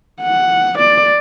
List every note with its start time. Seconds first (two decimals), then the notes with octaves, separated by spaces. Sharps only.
0.22 F#5
0.79 D5